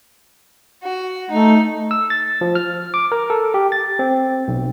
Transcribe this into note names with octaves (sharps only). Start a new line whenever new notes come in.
F#4
A3 D#4
E6
A6
F3
F6
D6
A#4
A4
G4
A6
C4
B1